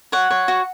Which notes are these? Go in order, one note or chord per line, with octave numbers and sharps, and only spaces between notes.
C#5 F#5
C#5
F#4